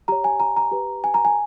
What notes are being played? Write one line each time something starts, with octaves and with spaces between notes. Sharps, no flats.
G4 C#5 A#5
G#5
A#5
A#5
G4 B4
G#5
A#5
G#5